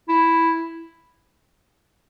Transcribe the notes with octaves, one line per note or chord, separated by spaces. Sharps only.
E4